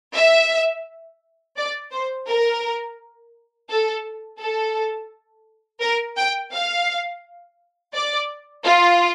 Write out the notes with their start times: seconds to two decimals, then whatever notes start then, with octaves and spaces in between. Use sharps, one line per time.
0.15 E5
1.57 D5
1.91 C5
2.27 A#4
3.69 A4
4.39 A4
5.81 A#4
6.17 G5
6.52 F5
7.94 D5
8.64 F4